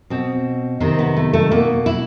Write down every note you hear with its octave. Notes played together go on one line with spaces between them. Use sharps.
B2 C4
C3 D#3 C4
B3
A3
A3
B2 A#3
E4